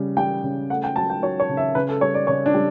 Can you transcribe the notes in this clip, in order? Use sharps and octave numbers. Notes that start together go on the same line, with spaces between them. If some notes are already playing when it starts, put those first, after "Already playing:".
Already playing: C#3 G3
G3 G5
C#3
A3 F#5
G5
F#3 A5
G5
F#3 C#5
C#5
C#3
E5
C#3 B4
A4
G3 C#5
D5
C#3 C#5
D4
G3